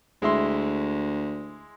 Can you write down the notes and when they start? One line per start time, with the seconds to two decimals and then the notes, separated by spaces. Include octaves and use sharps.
0.22 D2 G#3 E4 C6